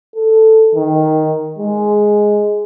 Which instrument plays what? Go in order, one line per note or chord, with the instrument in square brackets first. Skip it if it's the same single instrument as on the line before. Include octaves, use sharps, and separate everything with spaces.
[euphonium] A4
D#3
G#3